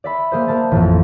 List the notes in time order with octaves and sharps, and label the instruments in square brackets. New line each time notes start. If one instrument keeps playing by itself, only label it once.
[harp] D5 E5 B5
A#3 G#4 C5
A#3 A5 A6
A1 F2